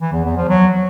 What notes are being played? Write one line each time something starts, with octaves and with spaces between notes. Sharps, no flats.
E3
E2
E2
F3
F#3